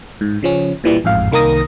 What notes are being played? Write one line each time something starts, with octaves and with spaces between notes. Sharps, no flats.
G#2
C#3 F3 C#4
A#2 E3 G3
A1 F2 G#2 F5
C2 D#3 A#3 A#4 D#6 A#6